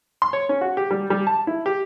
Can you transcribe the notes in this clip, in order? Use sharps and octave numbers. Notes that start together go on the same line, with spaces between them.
C6
C#5
C#4
F#4
G4
G3
G3
A5
E4
G4